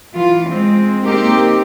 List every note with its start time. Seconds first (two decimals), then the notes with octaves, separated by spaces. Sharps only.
0.14 E3 F4
0.49 G#3 C4
1.05 A#3 C4 D#4 G4 A#4